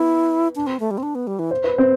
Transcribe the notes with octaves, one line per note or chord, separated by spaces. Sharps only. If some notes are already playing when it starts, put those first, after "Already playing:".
Already playing: B3 E4
D4
C4
A3
G3
C4
D4
B3
G3
E3
C5
B4
C4 C5